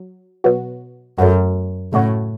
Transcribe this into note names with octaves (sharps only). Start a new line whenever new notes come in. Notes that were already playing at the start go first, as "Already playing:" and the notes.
Already playing: F#3
B2 F#3 B3 F#4
F#2 F#3 A3 F#4
A2 C#3 A3 F#4 C#5